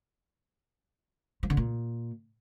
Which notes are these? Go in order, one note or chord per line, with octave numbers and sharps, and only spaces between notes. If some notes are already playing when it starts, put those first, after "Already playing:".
F3
D3
A#2